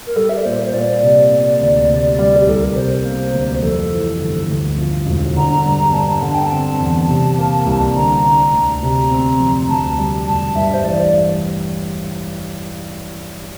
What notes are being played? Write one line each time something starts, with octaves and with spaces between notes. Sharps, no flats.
A#4
G3 A4
E5
D5
A#2 C5
C5
A#2 D5
C3
A#3
D2
C3
G3
G4
C2 A4
A#4
C3 C5
A#3
D2
F2 A4
E3
G1
D2
F3
E1
D3 A#5
G2 A#5
G2 A5
D3 A5
G5
A5
C4
E2
C3
A#3
C2
D3 A#5
D4
D2
C3
C4
F2
D2 A5
G3
E1 A5
G2 E5
C5
A1 D5